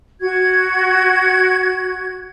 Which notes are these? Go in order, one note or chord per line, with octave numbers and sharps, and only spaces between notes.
F#4 G#6